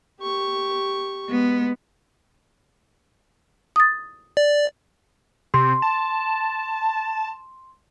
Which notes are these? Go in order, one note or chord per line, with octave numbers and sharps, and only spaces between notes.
G4 C#6
G#3 B3
D#6 A6
D5
C3 C6
A5